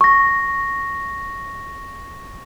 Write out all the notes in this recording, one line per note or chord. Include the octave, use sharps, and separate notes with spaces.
C#6 A#6